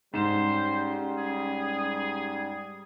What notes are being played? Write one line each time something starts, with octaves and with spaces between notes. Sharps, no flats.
G#2 G3 C#4 C5 E7
G#4